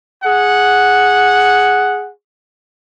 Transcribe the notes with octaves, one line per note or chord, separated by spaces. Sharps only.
G#4 F#5